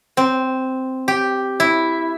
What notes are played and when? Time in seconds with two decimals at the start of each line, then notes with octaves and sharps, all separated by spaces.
0.17 C4
1.08 G4
1.60 E4